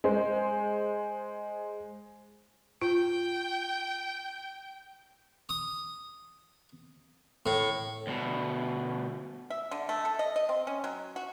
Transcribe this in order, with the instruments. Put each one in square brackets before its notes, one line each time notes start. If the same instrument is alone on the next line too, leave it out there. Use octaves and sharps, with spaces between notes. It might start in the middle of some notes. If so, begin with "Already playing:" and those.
[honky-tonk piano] G#3 C5
[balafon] F4 [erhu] G5
[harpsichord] D#6
A2
[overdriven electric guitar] D2 B2
[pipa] E5
D3
A3
A4
D#5
D#5
C4
C#4
F#3
F#4